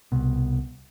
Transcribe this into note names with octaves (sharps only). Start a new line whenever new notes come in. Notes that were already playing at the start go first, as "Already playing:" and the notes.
C2 B2